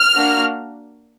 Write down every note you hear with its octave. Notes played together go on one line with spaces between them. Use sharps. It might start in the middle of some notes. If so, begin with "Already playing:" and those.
Already playing: F6
A#3 D4 F#4